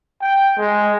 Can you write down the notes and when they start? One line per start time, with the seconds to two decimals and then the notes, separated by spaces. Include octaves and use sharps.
0.21 G5
0.58 G#3